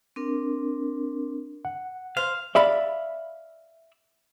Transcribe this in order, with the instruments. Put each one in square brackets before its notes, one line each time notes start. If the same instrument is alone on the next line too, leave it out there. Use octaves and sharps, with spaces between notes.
[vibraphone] C4 D4 A#4
[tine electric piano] F#5
[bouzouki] C5 [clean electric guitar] F5
[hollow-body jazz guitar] D5 E5 F5 B5